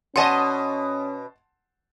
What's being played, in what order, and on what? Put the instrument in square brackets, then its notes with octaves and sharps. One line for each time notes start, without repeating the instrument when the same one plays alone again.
[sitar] B2 D5 D#5 [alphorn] C#4 [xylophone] F#5 G#5 [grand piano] A5 C6